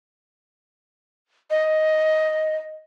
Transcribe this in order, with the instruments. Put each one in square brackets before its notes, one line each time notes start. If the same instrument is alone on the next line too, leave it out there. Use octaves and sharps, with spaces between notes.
[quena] D#5